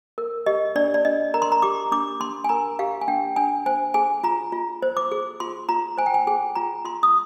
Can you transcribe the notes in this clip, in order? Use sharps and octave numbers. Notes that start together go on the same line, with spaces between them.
A#4
G4 D#5
D4 D5
D5
D4 D#5
A#4 A#5
C6
A#5
G4 D6
D4 D6
D4 C6
G#5
A#4 A#5
G4 F5
G#5
D4 G5
D4 G#5
C5 G#5
G#4 G#5
F4 A#5
F4
C5
D6
G#4
F4 C6
F4 A#5
C5 G#5
G5
G#5
G#4 G#5
F4 A#5
F4 C6
D#6